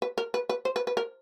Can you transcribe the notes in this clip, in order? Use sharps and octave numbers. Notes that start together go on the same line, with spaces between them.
B4
A#4
B4
B4
C5
B4
B4
A#4